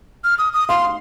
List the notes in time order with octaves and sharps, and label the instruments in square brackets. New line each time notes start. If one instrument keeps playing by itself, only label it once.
[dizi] F6
D#6
D#6
[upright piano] F5 [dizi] C6